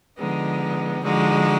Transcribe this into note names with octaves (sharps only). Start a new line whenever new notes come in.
D3 F3 G#3 B3 D#4
D3 F3 G#3 D#4 F#4